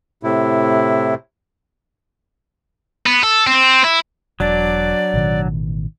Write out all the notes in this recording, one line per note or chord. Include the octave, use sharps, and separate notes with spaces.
A2 C3 E4
B3
A4
C4
E4
E1 F#3 D4 D5
A1 B2 D#3